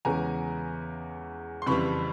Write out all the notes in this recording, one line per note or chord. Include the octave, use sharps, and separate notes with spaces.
E2 C#3 E3 G#3 C#4 G#5 A#5
C6
F2 C#3 E3 G3 B5 C#6